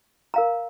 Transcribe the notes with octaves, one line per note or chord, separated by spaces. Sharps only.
A#4 F5 A#5